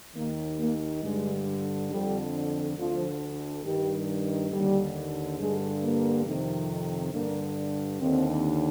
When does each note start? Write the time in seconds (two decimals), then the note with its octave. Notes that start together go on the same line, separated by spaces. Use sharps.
0.15 D#2 D#3 A#3
0.59 A#3
1.02 G2 D3 G#3
1.90 F2 D3 G3
2.77 D2 D3 F3
3.64 G2 D#3 G3
4.51 D#2 D3 G3
5.39 G2 D3 G#3
5.82 A#3
6.26 F2 C3 D#3
7.13 G2 D3 A#3
8.01 D#2 D3 C4